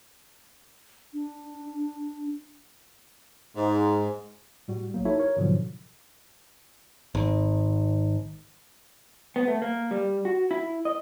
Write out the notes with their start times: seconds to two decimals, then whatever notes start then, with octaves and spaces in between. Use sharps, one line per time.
1.14 D4
3.56 G#2
4.68 A2 G3 F#4
4.94 A#1 F#3 A#3
5.05 D#4 E4 F#4 A4 C#5 E5
5.20 A#4 C#5
5.37 G#2 B2 D3 F3 F#3
7.15 G#1
9.36 B3
9.48 A3
9.62 A#3
9.91 G3
10.25 F#4
10.51 E4
10.85 D#5